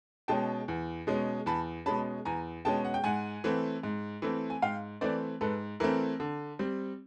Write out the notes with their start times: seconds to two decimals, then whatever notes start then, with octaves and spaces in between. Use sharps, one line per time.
0.28 B2 G#3 C#4 G5 A5
0.68 E2
1.07 B2 G#3 C#4
1.46 E2 A5 B5
1.86 B2 G#3 C#4 A5 B5
2.25 E2 G#5 A#5
2.65 B2 G#3 C#4 G5 A5
2.85 F#5
2.94 G5
3.04 G#2 F#5 G#5
3.44 E3 A3 C4
3.83 G#2
4.22 E3 A3 C4
4.50 G#5
4.62 G#2 F5 G5
5.01 E3 A3 C4 C5 D5
5.41 G#2 A4 B4
5.80 E3 A3 C4 A#4
6.20 D3
6.59 G3 C4